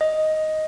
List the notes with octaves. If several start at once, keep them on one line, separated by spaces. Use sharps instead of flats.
D#5